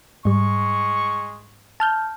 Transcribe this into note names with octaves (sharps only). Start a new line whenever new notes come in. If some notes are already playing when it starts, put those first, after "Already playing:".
G#2 G3 G#3 C#6
A5 F6 G6